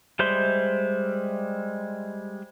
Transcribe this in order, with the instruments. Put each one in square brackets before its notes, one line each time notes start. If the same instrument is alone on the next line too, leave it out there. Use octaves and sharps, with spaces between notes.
[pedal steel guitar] G3 G#3 C5 E5 C6